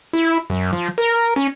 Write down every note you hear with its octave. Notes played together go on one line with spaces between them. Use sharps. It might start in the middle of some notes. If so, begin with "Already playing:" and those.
E4
F#2
F3
A#4
C#4